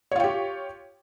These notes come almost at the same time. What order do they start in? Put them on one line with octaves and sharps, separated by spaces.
C#5 F4 G5 G4